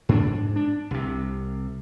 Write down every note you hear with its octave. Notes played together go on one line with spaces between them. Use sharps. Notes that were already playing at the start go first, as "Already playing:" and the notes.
G#2 D4
D4
C2 C3